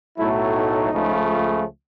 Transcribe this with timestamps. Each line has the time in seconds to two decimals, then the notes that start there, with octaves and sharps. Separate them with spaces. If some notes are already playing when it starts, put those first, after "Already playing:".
0.18 B1 A2 F#3 A3 E4
0.55 D#4
0.92 C#2 C#3 F3 A3